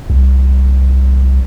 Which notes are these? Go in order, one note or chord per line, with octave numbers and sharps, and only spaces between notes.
C2